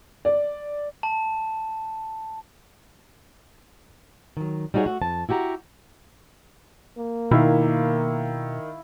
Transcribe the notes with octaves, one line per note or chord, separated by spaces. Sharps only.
D5
A5
D#3 F#3
G3 D#4 F#4 G#4 C#5
A3 F#4
F2 A5
E4 F#4 G4 A5 A#5
A#3
B2 D#3 E4 E5 F5